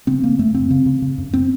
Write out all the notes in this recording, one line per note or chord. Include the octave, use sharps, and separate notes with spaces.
C#3 C4
C#3 A#3
F#2 A3
C#3 C4
C#3
C#3
C#3
F#2
C4